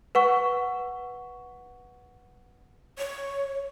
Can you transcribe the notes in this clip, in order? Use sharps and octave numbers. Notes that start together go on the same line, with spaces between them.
B4 F#5 C#6
C#5